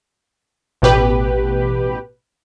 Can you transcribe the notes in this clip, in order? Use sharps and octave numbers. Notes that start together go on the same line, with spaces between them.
A1 B2 G4 B4